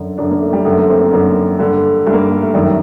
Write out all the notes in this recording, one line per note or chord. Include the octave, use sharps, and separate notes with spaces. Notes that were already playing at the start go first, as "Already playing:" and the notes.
Already playing: F#2 D3
F#2 D3 D4
A#3
A3
G3
F#2 D3 A3
A#3
C4
C4
F#2 D3 A#3
G2 D3
G2 D3 A3
A#3
A3
A3
A3
F#2 D#3 G3
A3